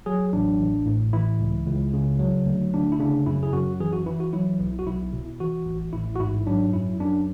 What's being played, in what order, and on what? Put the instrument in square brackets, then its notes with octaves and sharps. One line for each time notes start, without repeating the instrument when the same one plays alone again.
[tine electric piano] F#3 G#4
A1 D4
A1
A2
E3 E4
C#2
C#2
C#3
F#3
D2
D2 D4
E4
C#3 D4
F#2 E4
G#4
F#2 F#4
E3 G#4
F#4
E3 E4
F#4
F#3 E4
B1
F#4
B1 E4
B2
E3 F#4
A1
A1 E4
F#4
G#2 E4
F#3 D4
F#2 E4
F#2 D4